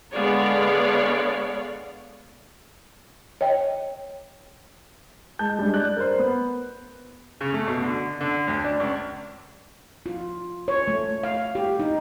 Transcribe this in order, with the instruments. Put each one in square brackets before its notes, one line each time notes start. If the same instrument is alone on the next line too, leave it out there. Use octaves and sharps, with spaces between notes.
[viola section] D3 G#3 B3 C#5 D5 F5
[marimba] C#5 D#5 G5
[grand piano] G#3 A5 G6
G3 G#3 D4
D5 F#6 G6
A#4 C5
B3
[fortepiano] C#3
A3
B2
D3
D3
D2
D4
C#2
[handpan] F4
C#5
A3
F5
G4
D#4